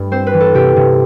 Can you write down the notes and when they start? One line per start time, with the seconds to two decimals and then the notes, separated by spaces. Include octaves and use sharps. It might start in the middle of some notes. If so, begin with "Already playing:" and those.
Already playing: G2 A3
0.11 C4 C5
0.27 B4
0.34 E3
0.40 A4
0.54 C3 G4
0.76 C3